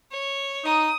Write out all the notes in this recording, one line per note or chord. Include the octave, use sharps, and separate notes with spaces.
C#5
D#4 A#5 D#6